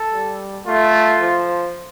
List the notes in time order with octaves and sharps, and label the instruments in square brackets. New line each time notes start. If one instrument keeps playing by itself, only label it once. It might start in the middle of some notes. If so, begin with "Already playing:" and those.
Already playing: [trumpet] A4
[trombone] G3
[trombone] A3 [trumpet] F4
[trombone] F3